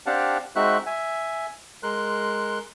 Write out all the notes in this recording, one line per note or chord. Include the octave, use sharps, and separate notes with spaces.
C4 D4 G4 F5 F#5 A5
G#3 C4 D#4 F#4 E5 F#6
E5 G#5
G#3 A#4 C6 F#6